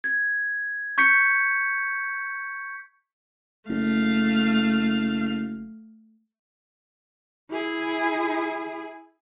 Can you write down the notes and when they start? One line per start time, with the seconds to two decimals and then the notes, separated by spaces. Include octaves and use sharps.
0.04 G#6
0.98 C#6 G6 B6 C#7
3.69 F#1 A3 F5
7.51 E4 G#4